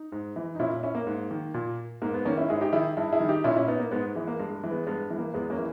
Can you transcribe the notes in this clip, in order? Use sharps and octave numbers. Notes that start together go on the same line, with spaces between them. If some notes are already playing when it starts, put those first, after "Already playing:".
Already playing: D#4
G#2
E3
D#4
A#2 C#4 E4
C#4 E4
A#3
G#2
D#3
A#2
G#2 A#3
G#3 B3
D#3 A#3 C#4
C#4 E4
G#2 E4 G#4
D#4 G4
D#3 E4 G#4
G2 E4 G#4
E4 G#4
D#3
D#4 G4
A#2 C#4 E4
C#4 E4
B3 D#4
A#3
G#2 G#3 B3
E3 G#3
A#3
G2 G#3
G#3
E3
G#3 B3
G2 G#3 B3
E3
A#3
E2 G#3 B3
A#3 C#4
E3